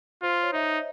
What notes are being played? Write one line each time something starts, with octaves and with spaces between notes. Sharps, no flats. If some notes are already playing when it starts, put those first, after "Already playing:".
F4 C5
C#5
D#4 E5
D#5